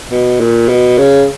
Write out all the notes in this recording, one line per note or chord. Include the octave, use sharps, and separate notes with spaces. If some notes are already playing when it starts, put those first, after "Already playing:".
B2
A#2
B2
C#3